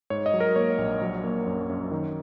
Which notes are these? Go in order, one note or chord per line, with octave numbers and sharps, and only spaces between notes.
G#2 C#5
D#5
F#3
A#4
A#3 C#5
A#1
F#3
A#3
F#2
F#2
D#3